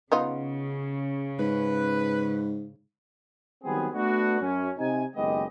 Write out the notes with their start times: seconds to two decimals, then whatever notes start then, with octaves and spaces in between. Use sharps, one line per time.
0.12 C#3 B3 D#4 F4
1.39 G#2 B4
3.64 D#3 F#3 G3 B3 C4 G#4
3.93 A3 B3 D4 F#4
4.40 F#2 C#4
4.77 C3 D#4 G#5
5.16 F#1 D#3 G#3 B3 G4 D#5